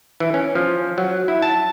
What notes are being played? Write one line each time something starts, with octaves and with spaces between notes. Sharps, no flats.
E3
C#4
F3
F#3
E4
A5